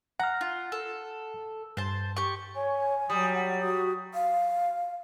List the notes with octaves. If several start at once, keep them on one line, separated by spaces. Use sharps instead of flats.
F#5 A#5 F6
F4
A4
G2 C5 A5
G4 C#6
C#5 G#5
F#3 G3 D#6
F#5
F#4 D#6
F5